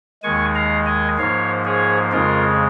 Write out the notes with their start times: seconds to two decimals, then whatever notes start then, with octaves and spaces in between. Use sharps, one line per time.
0.23 D#2 D#3 G#3 G#5 C#6
0.55 F5 A#5
0.86 D#5 G#5
1.18 G#2 F3 A#3 C#5 F5
1.65 G#4 C#5
2.12 F2 C#3 G#3 F4 A#4